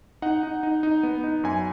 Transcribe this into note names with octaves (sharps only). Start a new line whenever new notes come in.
D#4 F#5
D#4
D#4
D#4
B3
D#4
F#2 G#5